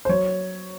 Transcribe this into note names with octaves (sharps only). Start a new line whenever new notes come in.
C5
F#3 C#5